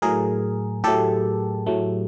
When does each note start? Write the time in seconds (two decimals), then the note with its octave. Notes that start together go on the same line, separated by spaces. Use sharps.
0.02 A2 F#3 A3 G#4 A#4
0.84 A2 F#3 A3 G4 A4
1.67 A2 F#3 A3